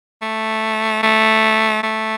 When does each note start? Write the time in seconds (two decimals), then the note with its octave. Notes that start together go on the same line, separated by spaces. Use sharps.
0.22 A3
1.03 A3
1.83 A3